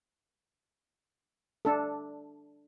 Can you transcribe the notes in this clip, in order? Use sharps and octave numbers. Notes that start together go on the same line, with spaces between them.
D4 A4